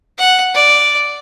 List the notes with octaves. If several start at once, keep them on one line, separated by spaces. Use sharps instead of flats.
F#5
D5